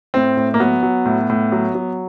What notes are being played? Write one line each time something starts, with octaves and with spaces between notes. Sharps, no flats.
A2 C4
A2
A#3
F#3 B3
F#3
A2
A2
F#3
F#3